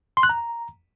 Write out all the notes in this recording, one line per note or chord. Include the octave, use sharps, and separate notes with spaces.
C6
F#6
A#5